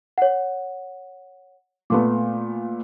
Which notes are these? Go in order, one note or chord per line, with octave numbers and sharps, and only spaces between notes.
C#5 F#5
A#2 A3 B3 D6